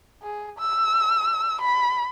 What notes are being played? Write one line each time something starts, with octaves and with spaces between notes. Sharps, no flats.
G#4
E6
B5